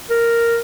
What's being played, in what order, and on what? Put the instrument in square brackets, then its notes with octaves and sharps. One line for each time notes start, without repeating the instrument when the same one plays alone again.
[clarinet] A#4